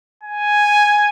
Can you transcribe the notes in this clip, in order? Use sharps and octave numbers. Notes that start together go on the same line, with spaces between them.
G#5